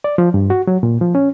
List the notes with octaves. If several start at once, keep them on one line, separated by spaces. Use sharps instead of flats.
D5
F3
G2
F#4
F#3
A#2
F3
C#4